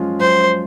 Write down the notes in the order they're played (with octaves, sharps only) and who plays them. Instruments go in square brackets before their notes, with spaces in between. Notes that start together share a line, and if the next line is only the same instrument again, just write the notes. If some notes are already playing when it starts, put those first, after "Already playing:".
Already playing: [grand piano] F#2 F3 G#3 C#4 F4
[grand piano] F#2 [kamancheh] C5